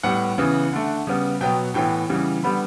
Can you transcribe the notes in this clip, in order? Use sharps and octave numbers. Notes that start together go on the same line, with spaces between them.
A2 G3 B3 F#5
C#3 E3 B3
D3 A3
C#3 G3 B3
B2 F#3 B3 G5
A2 E3 B3 G5
C#3 E3 G3 B3
D3 G3 B3 B5